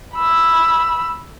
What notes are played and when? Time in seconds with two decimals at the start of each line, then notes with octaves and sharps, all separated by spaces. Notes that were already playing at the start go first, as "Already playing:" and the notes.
0.15 B5 E6